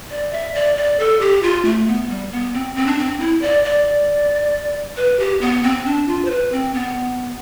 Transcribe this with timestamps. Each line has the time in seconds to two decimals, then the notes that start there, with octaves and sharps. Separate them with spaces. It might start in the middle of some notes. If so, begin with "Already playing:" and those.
0.10 D5
0.32 E5
0.55 D5
0.77 D5
0.99 A4
1.21 G4
1.43 F4
1.65 A3
1.88 B3
2.09 G3
2.32 B3
2.54 C4
2.76 C4
2.87 D4
2.99 C4
3.20 E4
3.42 D5
3.65 D5
4.97 B4
5.20 G4
5.41 B3
5.64 C4
5.86 D4
6.08 F4
6.25 C5
6.30 B4
6.52 C4
6.74 B3